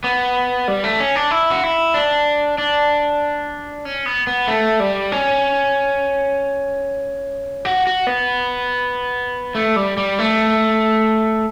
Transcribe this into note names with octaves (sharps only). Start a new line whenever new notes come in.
B3
G3
A3
C#4
D4
E4
F#4
E4
D4
D4
C#4
B3
B3
A3
G3
C#4
F#4
F#4
B3
A3
G3
G3
A3